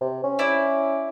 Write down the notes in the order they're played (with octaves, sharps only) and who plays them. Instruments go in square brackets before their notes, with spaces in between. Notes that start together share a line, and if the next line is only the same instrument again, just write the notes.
[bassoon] C3
C#4
[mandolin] E4 D5